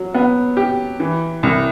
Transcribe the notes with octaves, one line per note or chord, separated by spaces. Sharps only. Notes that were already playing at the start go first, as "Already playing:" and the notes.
Already playing: F#3
B3
G4
E3
C2